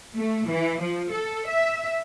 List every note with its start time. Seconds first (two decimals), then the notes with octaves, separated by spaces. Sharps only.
0.18 A3
0.47 E3
0.83 F3
1.14 A4
1.49 E5